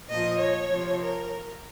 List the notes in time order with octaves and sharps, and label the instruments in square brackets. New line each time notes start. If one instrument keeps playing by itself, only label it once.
[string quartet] A#2 F3 D#5
C#5
C3 F3
A#4